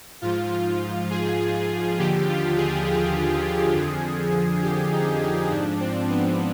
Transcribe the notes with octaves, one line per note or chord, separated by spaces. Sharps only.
G#2 F3 F4
F4
G#4
D#2 D3 F3 G4
F4
G#4
G#4
F2 D3 F3
G4
D#4
D#4
G#2 F3 D4
C4
B3